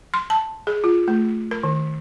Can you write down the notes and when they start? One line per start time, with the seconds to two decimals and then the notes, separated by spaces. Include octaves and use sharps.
0.14 C6
0.30 A5
0.67 G#4
0.84 F4
1.08 A3
1.51 A#4
1.63 D#3